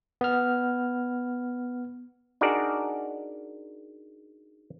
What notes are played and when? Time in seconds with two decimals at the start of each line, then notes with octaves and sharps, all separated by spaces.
0.21 B3 F6
2.41 D4 D#4 F#4 G#4 A#4 D5